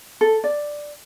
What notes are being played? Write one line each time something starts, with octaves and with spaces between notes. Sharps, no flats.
A4
D5